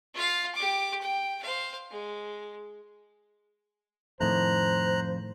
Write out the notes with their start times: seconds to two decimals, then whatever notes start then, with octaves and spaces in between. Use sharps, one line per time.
0.14 F4 F5
0.55 G4 D6
1.01 G5
1.43 C5 F5
1.91 G#3
4.20 F2 A2 D#3 A3 C5 A#5 F#6